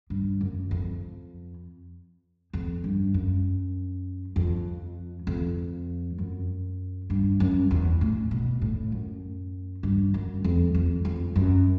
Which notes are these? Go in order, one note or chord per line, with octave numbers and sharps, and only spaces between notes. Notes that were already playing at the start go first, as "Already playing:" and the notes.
G2
F#2
F2
F2
G2
F#2
F2
F2
F#2
G2
F#2
E2
A2
B2
A2
F#2
G2
F#2
F2
F2
F2
F#2